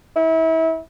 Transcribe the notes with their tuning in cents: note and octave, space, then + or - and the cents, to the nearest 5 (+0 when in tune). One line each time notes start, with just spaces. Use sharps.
E4 -30